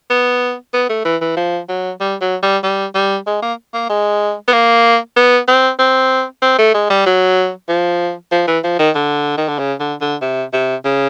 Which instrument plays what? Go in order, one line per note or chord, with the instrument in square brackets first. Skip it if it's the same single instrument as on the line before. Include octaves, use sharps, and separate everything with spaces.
[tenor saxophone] B3
B3
A3
E3
E3
F3
F#3
G3
F#3
G3
G3
G3
G#3
A#3
A#3
G#3
B3
A#3
B3
C4
C4
C4
A3
G#3
G3
F#3
F3
F3
E3
F3
D#3
D3
D#3
D3
C#3
D3
D3
C3
C3
C#3